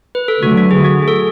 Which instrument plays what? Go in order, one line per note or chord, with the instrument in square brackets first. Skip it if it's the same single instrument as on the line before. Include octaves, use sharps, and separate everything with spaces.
[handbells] B4
A4
[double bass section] D3 F#3 A3 [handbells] F#4
[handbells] F#4
G#4
F#4
G#4
A4